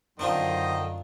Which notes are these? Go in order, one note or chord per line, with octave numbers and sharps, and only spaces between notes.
F#2 D3 D#3 C4 D4 F4 C5 D#5